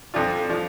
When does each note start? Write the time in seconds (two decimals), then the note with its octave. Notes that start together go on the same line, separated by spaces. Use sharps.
0.14 F2 F3 D4 F4 A4
0.50 F3 D4 F4